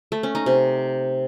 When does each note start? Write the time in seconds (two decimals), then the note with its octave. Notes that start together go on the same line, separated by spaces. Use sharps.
0.12 A3
0.23 C#4
0.35 D#4
0.46 C3